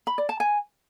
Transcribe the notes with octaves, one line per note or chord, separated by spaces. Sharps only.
B5
D5
A5
G#5